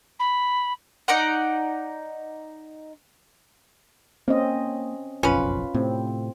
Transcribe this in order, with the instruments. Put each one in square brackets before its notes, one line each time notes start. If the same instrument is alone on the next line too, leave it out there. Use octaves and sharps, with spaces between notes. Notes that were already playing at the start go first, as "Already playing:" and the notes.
[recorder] B5
[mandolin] D#4 D5 F#5
[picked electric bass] A#3 [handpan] C4 C#4 D#5
[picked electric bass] F#1 B1 F2 [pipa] C#4 B4 [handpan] F4
[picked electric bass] A2 C3 [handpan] C4